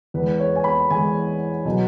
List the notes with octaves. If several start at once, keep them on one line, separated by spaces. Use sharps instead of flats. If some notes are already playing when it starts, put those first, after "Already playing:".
E2 E3 G#3 B4
C#5
G#5
B5
E2 E3 G#3 G#5
B2 F#3